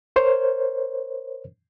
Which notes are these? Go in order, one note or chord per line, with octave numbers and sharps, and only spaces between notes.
A#4 C5 C#5